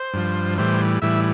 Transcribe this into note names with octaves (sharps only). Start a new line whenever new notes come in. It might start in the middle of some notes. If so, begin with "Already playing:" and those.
Already playing: C5
G2 F3
A2 E3 G3 C5
A2 E3 G3 E5